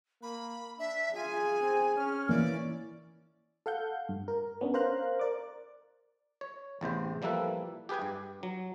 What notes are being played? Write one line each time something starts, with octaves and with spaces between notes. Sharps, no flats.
A#3 B5
D4 E5
F4 G#4 G#5
C4
C#4 F6
E3 A#3 E4 D5
A4 F5 F#5 G6
G2
A#4
B3 C#4 D4
A#4 C5 F5 A#5 F#6
A#4 D5 D6
C#5
A1 E2 C3 C5
F3 G3 A#3 E4 A4 B4
G4 G#4 B4 G5 G#5
G2
F#3